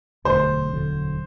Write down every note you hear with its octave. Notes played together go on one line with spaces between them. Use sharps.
E1 D2 D3 F#3 C5
E1 D2 D3 F#3